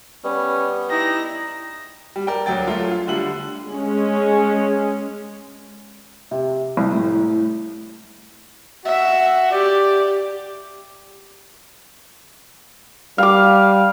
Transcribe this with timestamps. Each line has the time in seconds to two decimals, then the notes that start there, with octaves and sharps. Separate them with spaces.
0.24 G3 B3 C#4
0.90 D#4 E4 G4 A#6
2.16 G3
2.27 A#4 D5 G5
2.46 D2 F#3 G5 A6
2.67 F#3 A3 F4
2.91 F4
3.08 D3 G3 A3 F#7
3.69 G#3 C#4
6.31 C3
6.77 C2
6.92 A2
8.85 F#4 E5
9.52 G4 D5
13.18 G3 F5 D6